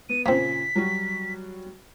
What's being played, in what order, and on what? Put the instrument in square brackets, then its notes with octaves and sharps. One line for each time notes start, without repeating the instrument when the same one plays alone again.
[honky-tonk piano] B3 [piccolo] D#7
[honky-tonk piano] A#2 C#3 [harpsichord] A#3 C4 [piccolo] B6
[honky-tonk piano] F#3 G3 F#4